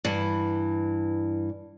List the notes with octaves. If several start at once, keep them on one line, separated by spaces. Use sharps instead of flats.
G2 E3